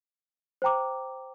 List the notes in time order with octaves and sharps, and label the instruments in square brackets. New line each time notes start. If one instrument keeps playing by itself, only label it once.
[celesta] C5 G5 A#5 D6